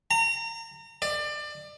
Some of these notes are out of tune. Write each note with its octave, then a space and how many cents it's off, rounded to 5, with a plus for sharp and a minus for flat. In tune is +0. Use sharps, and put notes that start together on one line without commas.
A#5 -35
D5 +25